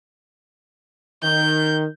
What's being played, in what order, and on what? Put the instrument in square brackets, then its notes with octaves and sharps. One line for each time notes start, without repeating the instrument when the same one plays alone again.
[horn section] D#3 [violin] G6